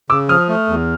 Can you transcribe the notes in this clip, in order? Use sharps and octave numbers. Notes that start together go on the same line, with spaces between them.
C#3 D6 E6
F3 D#6 F6
A3
E2